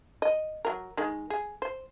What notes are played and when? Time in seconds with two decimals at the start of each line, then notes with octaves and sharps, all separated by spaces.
0.22 D#5
0.65 F#3 A#4
0.97 D#3 G#3
1.30 G#4
1.62 C5